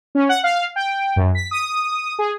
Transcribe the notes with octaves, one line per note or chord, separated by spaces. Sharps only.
C#4
F#5
F5
G5
F#2
B6
D#6
G#4